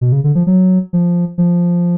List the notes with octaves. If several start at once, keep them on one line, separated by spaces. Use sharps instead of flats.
B2
C#3
D3
F3
F#3
F3
F3